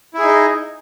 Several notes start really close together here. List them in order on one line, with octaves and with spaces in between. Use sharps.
E4 G#4 D#4 D#5